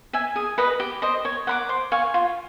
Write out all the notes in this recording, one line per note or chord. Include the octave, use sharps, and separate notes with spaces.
E5 G#5
G#4
B4 D#5
G4
C5 D#5
C#5
F#5 B5 D6
C5
F5 G#5 C#6
F4